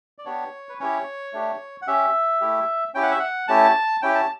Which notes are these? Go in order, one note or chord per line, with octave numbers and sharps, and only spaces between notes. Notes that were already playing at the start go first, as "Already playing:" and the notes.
D5
B3 D4 G4 C#5
B4
C#4 E4 G4 C#5
A3 D4 G4
F#5
C#4 G4 E5
A3 E4 G4
C#4 E4 G4 G5
F#5
E5
F#5
A3 C#4 E4 G4 A5
C#4 E4 G4 G5
A5